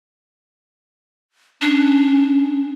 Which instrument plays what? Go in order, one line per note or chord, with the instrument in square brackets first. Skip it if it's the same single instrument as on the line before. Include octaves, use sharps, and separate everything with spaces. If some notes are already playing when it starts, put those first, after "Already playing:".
[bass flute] C#4 [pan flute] D4